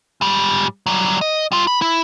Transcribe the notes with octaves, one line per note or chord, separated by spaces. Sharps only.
G#2 G3
F#3 G3
D#5
G3 F4
B5
E4